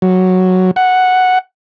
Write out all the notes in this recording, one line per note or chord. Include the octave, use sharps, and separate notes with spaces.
F#3
F#5